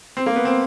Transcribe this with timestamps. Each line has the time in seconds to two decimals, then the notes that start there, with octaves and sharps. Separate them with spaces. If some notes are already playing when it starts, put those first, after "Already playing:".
0.17 C4
0.26 A#3
0.36 B3
0.45 C4